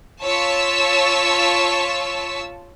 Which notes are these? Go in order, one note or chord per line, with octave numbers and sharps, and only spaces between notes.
F4 C#5 A5 C#6 E6 B6